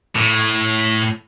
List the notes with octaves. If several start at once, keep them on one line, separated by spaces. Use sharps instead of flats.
A2